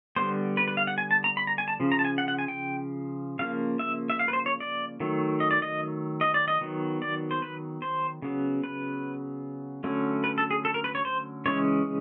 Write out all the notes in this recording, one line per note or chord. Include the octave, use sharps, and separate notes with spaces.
D3 G3 B3 C5
B4
B4
F5
F#5
G#5
A5
A#5
B5
A#5
G#5
A5
C#3 F3
A#5
A5
G#5
F#5
F#5
G#5
G5
C#3 F3 A#3 F5
E5
E5
F5
B4
C5
C#5
D5
D#3 F#3 A3
D#5
D5
D#5
D#5
D5
D#5
D#3 F#3 B3
D5
C5
B4
C5
C#3 F#3 B3
B4
D3 F#3 A3 C#4
B4
A4
G#4
A4
A#4
B4
C#5
C5
C#3 E3 G#3 C#4 C#5